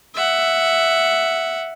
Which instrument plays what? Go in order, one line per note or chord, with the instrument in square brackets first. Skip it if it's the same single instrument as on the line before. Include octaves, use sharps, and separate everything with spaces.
[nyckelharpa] E5 F#5